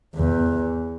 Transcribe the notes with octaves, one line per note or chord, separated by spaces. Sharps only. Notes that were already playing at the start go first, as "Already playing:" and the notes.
E2